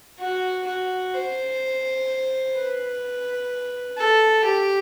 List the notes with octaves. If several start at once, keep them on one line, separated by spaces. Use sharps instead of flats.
F#4
F#4
C5
B4
A4
G4